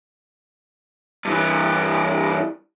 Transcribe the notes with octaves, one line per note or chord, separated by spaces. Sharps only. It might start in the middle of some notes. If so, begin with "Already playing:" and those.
G2 E3